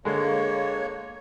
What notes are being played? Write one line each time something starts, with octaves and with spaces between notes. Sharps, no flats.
D3 G#3 A#3 C#5